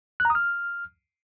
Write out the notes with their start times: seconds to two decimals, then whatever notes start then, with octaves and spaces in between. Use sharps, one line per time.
0.20 F#6
0.25 A#5
0.30 D#6
0.35 F6